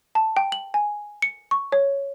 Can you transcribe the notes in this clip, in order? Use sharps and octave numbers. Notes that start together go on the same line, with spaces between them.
A5
G5
F#7
G#5
C#7
C#6
C#5